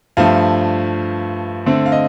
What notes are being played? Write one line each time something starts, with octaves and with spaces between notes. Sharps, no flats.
G2 F3 A3 F5
D3 A3 C4
F5
D#5